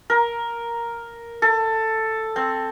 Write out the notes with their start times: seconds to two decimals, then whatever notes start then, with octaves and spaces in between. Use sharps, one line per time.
0.10 A#4
1.42 A4
2.36 C4